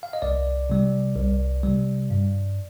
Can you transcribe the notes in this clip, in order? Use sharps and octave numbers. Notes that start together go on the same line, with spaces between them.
F5
D#5
C2 D5
C3 G3
C2
C3 G3
G2